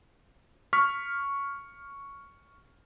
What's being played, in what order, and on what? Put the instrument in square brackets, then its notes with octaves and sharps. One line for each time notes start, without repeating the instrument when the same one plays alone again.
[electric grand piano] C#6 F6 B6